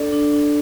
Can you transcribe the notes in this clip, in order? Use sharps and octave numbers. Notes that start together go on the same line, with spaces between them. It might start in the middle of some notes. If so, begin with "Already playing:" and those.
Already playing: D4 A4 D5
D4
D4